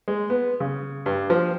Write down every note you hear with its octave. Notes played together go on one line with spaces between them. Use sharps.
G#3
B3
C#3
G2
F3